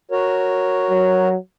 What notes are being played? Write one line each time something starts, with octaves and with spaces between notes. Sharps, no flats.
F#4 A#4 C#5
F#3